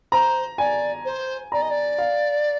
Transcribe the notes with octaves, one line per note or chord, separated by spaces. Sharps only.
C5 A#5
D5 G#5
C5
D5 A#5
D#5
D5
F5